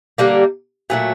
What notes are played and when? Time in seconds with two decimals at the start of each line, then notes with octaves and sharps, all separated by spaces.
0.18 D3 G3 A#3
0.90 A#2 F#3 A3